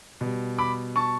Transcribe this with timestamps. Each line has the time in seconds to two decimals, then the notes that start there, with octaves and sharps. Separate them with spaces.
0.21 B2 G3
0.58 B5 D6
0.96 A5 C#6